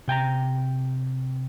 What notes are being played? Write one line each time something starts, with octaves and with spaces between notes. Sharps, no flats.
C3 G5 A5 A#5